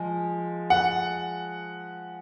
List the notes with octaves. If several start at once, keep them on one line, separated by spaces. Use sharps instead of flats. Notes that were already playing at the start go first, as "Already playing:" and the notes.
Already playing: F3 G#3
F#5